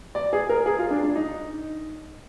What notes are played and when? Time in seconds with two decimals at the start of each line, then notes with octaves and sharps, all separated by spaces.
0.15 D5
0.33 G#4
0.49 A#4
0.66 G#4
0.79 F4
0.91 D4
1.03 D4
1.15 D#4